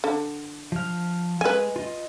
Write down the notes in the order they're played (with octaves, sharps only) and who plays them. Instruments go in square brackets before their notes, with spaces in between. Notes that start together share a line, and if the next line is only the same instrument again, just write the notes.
[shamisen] D3
[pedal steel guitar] F3 F6
[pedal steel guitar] G#3 [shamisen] B4 G#5
[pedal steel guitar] F4 D#5